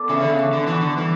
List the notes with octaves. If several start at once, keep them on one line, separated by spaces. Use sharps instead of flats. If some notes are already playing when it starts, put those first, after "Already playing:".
Already playing: B3 A4 D5
C#3 E3
D3
C#3
D4
D3
E3 F#4
D3
E3 G3